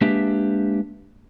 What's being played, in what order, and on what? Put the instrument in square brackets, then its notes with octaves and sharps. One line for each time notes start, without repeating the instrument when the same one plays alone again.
[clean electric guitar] G#3 A#3 D4 G4 B4 E5